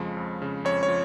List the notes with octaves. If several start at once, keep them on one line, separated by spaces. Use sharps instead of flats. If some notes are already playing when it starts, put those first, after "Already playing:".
Already playing: F2 C#3 F3 G#3
F2
C#3
F2 C#5
C#5
F3